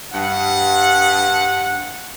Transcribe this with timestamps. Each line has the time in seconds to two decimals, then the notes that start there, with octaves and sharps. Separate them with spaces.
0.14 G2 F#5